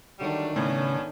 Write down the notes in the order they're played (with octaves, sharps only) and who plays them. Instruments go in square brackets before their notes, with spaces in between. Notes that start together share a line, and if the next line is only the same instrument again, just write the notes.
[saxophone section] D3 F#3 G3 [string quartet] D#3 A3 D4
[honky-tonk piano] A2 [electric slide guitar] C#3 [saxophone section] B3 C#4